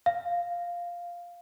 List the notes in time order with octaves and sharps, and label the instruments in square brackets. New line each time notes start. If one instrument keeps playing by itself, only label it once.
[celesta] F5